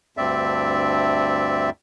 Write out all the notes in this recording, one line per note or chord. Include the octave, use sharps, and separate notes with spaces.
D2 G2 C4 D5 E5